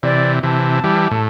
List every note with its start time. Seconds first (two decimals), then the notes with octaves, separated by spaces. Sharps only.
0.03 C3 E3 D5
0.43 C3 E3 A5
0.84 E3 G3
1.11 A2